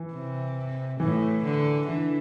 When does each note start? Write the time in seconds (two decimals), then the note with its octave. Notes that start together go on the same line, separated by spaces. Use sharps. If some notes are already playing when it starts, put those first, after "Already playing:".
Already playing: E3
0.13 C3
1.00 A2 E3
1.44 D3
1.87 D3 E3